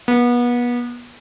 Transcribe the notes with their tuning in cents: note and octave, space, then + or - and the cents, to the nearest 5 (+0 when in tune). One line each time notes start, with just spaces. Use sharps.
B3 -30